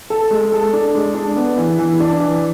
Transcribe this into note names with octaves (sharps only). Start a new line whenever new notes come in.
A4
G#3
A4
D4
G#3
D4
B3
E3
E3
D4
E3